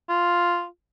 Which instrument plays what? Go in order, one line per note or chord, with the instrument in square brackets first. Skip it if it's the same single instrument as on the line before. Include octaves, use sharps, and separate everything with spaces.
[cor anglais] F4